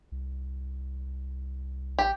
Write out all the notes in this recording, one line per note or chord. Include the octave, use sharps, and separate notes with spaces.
C2
A1 G4